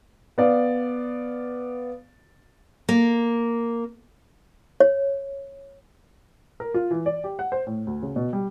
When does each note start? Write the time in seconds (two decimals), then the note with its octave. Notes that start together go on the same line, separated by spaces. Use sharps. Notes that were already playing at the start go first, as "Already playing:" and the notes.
0.38 B3 D5 F5
2.89 A#3
4.80 C#5
6.60 A#4
6.74 F4
6.91 E3
7.06 D5
7.24 G4
7.39 F#5
7.52 C5
7.67 A2
7.87 D2
8.02 C#3
8.16 B2
8.33 G3